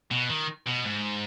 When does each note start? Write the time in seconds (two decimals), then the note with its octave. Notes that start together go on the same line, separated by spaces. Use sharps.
0.11 B2
0.29 D#3
0.66 B2
0.84 G#2